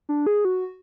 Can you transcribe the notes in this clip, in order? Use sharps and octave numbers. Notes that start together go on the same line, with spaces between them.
D4
G#4
F#4